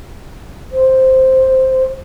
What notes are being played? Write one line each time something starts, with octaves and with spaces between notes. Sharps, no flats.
C5